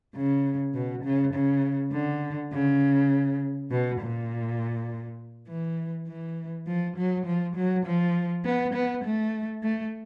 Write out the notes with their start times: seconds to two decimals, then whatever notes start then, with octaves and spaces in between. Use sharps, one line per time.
0.15 C#3
0.74 B2
1.04 C#3
1.34 C#3
1.92 D3
2.53 C#3
3.71 B2
4.01 A#2
5.48 E3
6.07 E3
6.67 F3
6.97 F#3
7.26 F3
7.56 F#3
7.85 F3
8.45 B3
8.74 B3
9.04 A3
9.63 A3